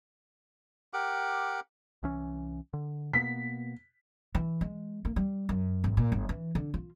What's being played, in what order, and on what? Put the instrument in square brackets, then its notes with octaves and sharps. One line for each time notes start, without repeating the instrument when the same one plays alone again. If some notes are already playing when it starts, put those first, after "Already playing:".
[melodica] G4 A#4 F#5 D6
[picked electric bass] C2 E3 C#4
D3
[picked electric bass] B2 A#3 B3 [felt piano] B6
[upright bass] E3
G#3
A#3
G3
F#2
G#1
A#2
G1
E3
D3
F4